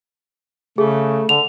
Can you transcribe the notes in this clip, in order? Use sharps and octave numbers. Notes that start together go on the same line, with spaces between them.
C#3 A3 G#4
D3 F7